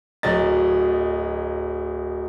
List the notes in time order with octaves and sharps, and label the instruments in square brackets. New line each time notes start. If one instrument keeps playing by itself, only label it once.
[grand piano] D1 F#3 D#5 A6